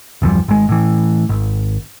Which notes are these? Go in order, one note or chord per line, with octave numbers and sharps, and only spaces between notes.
G1 E2 F3 G3
G#1 G#3
A2 E3
G#1